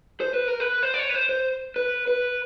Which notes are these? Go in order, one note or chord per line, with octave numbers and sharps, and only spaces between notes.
C5
B4
A#4
B4
C5
D5
C#5
B4
C5
C5
B4
B4